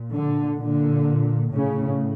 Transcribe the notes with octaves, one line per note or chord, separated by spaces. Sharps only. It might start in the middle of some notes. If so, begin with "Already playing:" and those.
Already playing: A#2
D3
A#2 D3
A2 C#3